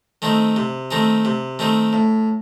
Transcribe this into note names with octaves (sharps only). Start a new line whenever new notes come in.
D#3 A3 C4 D#4
C3
D#3 A3 C4 D#4
C3
D#3 A3 C4 D#4
A2